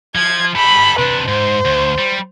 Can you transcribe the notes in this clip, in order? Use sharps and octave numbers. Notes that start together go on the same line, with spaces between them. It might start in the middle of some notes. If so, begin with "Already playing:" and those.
F3 G#6
G4 A4 B5
C3 D4 B4
G#2 C5
D2
G3